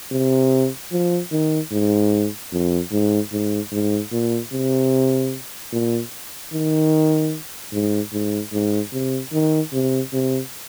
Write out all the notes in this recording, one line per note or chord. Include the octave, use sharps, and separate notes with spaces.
C3
F3
D#3
G#2
F2
G#2
G#2
G#2
A#2
C3
A#2
D#3
G#2
G#2
G#2
C3
D#3
C3
C3